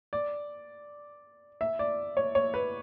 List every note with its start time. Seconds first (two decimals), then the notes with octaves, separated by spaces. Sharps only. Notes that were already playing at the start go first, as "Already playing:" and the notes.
0.13 D5
1.61 E5
1.79 D5
2.17 C#5
2.35 C#5
2.54 B4